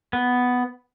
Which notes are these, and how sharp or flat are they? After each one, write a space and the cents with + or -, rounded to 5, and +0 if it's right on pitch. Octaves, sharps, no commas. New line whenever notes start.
B3 +5